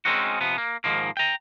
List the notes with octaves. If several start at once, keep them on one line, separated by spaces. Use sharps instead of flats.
G#3 C4 C#4 D#4 F#4
C3 F3 B3
A#3
G#2 D#3 F3 A#3
G5 A#5